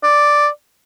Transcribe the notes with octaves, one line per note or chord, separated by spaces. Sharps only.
D5